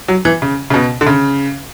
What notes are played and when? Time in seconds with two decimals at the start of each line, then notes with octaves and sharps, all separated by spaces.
0.08 F#3
0.25 E3
0.42 C#3
0.70 C#3
0.74 B2
1.01 D3
1.07 C#3